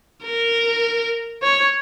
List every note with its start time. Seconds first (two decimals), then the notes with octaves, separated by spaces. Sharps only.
0.24 A#4
1.43 C#5